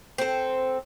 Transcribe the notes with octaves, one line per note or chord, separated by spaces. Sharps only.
C4 A4